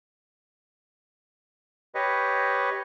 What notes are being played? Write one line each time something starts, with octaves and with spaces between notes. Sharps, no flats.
G4 B4 C#5 D#5